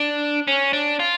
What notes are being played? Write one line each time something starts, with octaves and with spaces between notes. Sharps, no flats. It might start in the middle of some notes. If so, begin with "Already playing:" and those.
Already playing: D4
C#4
D4
F4